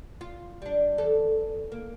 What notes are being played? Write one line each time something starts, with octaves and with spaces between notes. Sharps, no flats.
F4
G3 D4
E2 A4
A#3